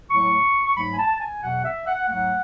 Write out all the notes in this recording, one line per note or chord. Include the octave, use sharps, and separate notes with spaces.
A2 F#3 A3 C#6
C#6
G#2 F#3 A3 B5
G#5
A5
G#5
E2 B2 F#3 F#5
E5
F#5
G#2 F#3 A3 F#5